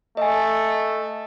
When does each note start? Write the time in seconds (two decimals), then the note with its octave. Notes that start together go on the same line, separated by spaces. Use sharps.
0.17 A3 D#5 G#5